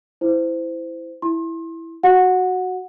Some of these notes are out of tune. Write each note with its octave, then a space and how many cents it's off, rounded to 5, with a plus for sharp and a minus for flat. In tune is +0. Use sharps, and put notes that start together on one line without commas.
E4 +0 C5 -25
E4 +0 C6 +30
F#4 +0 F#5 -15